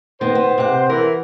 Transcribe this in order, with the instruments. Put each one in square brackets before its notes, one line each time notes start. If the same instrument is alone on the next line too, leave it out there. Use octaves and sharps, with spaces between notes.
[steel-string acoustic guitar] D#3 B3 [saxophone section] C5
[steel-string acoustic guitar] B3
C3 F#5
[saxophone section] E3 [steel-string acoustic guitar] A#4